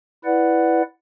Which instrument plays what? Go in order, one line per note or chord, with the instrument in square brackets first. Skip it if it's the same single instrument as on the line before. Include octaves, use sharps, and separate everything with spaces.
[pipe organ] E4 B4 D5 F#5